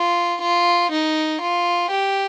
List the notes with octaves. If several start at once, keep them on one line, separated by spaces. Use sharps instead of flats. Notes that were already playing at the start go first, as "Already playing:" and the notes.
Already playing: F4
F4
D#4
F4
G4